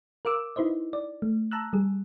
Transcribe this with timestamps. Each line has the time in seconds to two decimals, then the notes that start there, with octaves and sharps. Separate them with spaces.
0.25 A#4 F5 D6 E6
0.56 D#4 E4 B4 C5 D#5
0.93 D5
1.22 A3
1.51 A5 A#5 E6 F#6
1.73 G3 G#4